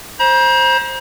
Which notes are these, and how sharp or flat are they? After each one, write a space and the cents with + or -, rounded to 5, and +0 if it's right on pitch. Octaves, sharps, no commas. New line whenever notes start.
C5 +15 A#5 +40